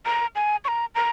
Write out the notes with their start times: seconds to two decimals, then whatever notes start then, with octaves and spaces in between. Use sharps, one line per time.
0.06 A#5
0.35 G#5
0.65 C#6
0.68 A#5
0.95 A#5